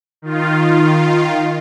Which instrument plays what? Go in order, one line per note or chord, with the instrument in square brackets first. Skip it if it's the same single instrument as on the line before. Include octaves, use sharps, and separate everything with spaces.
[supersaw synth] D#3 F4